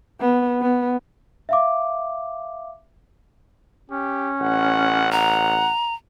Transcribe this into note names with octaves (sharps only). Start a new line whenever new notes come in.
B3
B3
E5 F5 D6
C#4 G4
A1 F#5
F#5 A#5